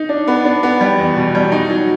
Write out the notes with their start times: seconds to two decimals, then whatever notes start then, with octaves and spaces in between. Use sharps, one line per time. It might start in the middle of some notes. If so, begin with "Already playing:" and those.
Already playing: D#4
0.09 D4
0.27 B3
0.45 D4
0.63 B3
0.81 G3
0.99 E2
1.16 B2
1.35 G3
1.52 D#4
1.70 F#3